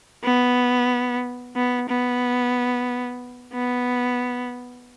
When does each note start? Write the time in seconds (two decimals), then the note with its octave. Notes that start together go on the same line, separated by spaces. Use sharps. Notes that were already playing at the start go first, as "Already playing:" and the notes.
0.24 B3
1.56 B3
1.89 B3
3.53 B3